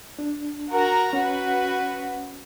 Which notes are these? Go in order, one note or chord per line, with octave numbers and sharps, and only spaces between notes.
D4
F#4 A#4 A#5
C#4 F#4 B4